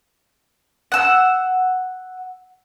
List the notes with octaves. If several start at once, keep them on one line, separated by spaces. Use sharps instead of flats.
F#5 E6